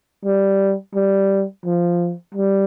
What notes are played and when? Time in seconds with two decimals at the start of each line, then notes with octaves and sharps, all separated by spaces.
0.25 G3
0.95 G3
1.65 F3
2.35 G3